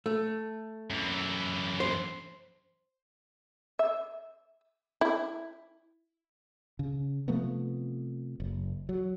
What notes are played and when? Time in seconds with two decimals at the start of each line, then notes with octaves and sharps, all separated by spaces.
0.06 A3
0.90 F#2 E3
1.80 C5
3.79 E5
5.01 E4
6.79 C#3
7.28 C3 F3 A3 B3
8.40 F#1
8.89 F#3